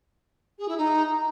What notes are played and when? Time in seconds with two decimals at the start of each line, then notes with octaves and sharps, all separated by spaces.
0.58 G#4
0.68 E4
0.77 D#4